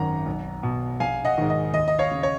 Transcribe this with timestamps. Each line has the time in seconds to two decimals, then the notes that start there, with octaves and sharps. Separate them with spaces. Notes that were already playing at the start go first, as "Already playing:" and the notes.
Already playing: G#1 F#2 D#3 F#5 A#5
0.26 B1
0.63 B2
1.00 A#1 F5 G#5
1.25 D#5 F#5
1.38 G#2 D#3
1.50 D#5
1.74 D#2 D#5
1.88 D#5
1.99 C#5 F5
2.11 C#3
2.23 C#5